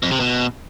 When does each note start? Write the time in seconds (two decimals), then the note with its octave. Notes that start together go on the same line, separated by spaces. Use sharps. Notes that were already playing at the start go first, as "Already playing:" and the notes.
0.03 F2
0.11 C3
0.20 B2